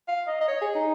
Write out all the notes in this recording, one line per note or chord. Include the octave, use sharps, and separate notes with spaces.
F5
D#5
D#5
C#5
G#4
D#4